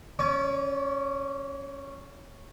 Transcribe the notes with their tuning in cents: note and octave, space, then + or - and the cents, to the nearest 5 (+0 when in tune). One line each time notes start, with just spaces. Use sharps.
C#4 -10 D5 -45 C#6 +45